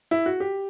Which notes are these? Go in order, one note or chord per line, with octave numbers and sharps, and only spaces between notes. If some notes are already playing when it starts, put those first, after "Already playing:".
E4
F#4
G4